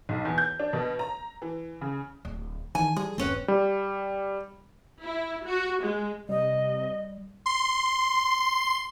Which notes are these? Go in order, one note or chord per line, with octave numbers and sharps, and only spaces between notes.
B1
E2
G6
D4
B2
A#5
E3
C#3
D1
D#3 E3 G#5
G3 G#4
E1 G2 D#3 C4 C#4 B4
G3
E4
F#4
G#3
C3 G3 D#5
C6